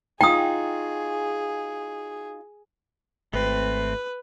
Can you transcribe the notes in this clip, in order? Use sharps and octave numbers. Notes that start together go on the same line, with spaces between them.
D#4 F4 F#4 G#4 G5 D#6
G#1 A3 C4 B4